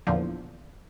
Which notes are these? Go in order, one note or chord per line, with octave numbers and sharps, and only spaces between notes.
E2 A#2 D3 F3